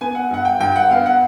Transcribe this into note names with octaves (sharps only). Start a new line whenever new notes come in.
B3 G#5
F#5
G2 F#5
G5
G2 G5
F#5
B3 F5
F#5